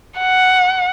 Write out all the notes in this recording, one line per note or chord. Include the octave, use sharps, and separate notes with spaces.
F#5